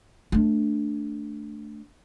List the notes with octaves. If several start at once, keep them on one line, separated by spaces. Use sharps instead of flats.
A3 D4